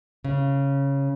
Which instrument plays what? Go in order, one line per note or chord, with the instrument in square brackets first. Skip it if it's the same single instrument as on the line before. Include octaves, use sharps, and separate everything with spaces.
[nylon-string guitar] C#3